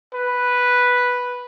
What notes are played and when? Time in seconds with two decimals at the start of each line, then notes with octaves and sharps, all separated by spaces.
0.14 B4